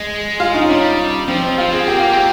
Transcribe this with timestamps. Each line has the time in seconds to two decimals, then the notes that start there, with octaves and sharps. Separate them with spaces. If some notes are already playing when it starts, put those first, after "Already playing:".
Already playing: G#3
0.40 F4
0.54 D#4
0.63 C#4
0.69 G3 D#4
1.28 F3 C4
1.58 F3 F4
1.72 C4 G#4
1.88 A#3 G4
1.99 F4
2.10 C4 G4
2.18 A#3